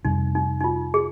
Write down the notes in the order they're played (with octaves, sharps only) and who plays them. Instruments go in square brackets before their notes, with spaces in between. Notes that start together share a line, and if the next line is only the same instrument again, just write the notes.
[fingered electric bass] F2 C3 G3 [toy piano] D#4
[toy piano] D#4
D#4
F4
G#4